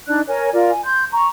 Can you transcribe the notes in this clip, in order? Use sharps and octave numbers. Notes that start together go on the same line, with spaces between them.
D4 D#4 D5 F#6
A#4 C#5 G#5
F4 A#4 D5
G#5
C6 G6
A#5 C#6